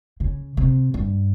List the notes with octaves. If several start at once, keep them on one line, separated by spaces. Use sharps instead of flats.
C#3
C3
G2